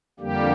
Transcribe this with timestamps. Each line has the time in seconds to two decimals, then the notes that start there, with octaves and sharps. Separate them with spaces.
0.20 F2 D3 G3 A#3 G4